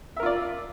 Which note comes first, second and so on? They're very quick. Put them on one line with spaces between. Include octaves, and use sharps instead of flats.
E5 A#4 F4 D5